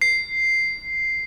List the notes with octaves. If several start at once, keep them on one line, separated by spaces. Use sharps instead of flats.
C7